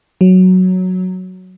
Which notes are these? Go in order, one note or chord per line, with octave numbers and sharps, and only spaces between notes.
F#3